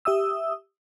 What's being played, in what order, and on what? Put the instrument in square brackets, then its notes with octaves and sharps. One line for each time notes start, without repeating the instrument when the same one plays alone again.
[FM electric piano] G4 E5 D#6 E6